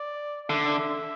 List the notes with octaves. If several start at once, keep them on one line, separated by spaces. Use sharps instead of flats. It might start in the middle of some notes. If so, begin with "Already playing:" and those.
Already playing: D5
D3 E5